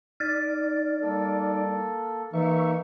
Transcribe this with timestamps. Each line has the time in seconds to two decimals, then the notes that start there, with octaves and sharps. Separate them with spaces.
0.20 D#4 D5 F6 A6
1.02 G3 A#3 A4
2.33 E3 A#3 D#4 E5 C#6